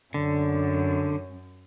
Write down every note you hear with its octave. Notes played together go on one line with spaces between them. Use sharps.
F#2 D3